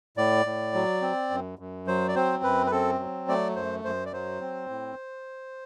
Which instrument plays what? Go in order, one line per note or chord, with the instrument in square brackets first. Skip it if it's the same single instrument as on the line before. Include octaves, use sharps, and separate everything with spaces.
[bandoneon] A2 D5
A2
F#3
C4
F#2
F#2
F#3 C5
D5
C4 C5
F#2 B4
B4
C4 A4
F#3
A3 D5
F#2 C5
F#2 C5
D5
F#3 C5
C4
A2